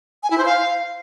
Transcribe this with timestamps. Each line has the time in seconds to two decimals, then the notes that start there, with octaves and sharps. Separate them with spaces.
0.23 G#5
0.30 E4
0.38 C5
0.45 F5